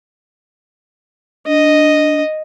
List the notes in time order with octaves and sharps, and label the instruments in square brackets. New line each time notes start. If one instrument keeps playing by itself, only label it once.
[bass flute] D4 [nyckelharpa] D#5